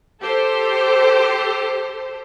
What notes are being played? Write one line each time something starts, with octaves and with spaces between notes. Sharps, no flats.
G4 A4 C5